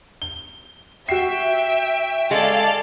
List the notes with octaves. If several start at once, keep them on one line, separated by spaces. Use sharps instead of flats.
G7
F#4 E5 G5 C7
G#3 A4 D5 F5